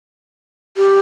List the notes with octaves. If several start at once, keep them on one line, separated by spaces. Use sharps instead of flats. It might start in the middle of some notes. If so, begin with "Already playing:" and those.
G4